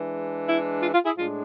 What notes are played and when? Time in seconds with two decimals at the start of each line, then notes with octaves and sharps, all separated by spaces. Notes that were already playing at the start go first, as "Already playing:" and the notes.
Already playing: E3 G#3 D4
0.48 E4
0.83 F4
0.94 F4
1.06 E4 G#4
1.17 A2 G#3 D4 F4